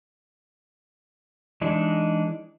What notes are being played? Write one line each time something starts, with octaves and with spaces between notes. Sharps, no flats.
E3 G#3 D4 D#4